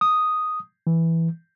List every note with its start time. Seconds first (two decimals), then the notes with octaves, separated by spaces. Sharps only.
0.01 D#6
0.87 E3